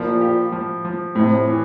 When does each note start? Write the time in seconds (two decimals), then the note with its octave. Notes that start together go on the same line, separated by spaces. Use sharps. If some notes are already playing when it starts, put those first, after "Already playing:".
Already playing: A#2 F3 E4
0.21 G4
0.52 F3
0.85 F3
1.15 A2 C3
1.47 E3